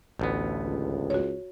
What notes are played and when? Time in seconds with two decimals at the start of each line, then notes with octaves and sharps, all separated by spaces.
0.19 A1 D2 B3
0.65 C#2
1.10 F#4 C#5